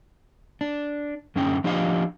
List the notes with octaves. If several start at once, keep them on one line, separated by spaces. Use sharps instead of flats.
D4
F#2 D3 C#4 G5
F3 D4 F4 G4 D#5 F5